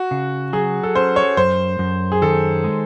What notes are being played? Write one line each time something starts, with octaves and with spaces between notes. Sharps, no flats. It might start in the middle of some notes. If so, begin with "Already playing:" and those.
Already playing: F#4
C#3
F#3 G#4
A4
C#4 C5
C#5
F#2 C5
F#2
G#4
D#3 A4
G#3